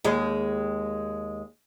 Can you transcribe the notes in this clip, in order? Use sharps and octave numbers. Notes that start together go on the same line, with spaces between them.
D#2 G#3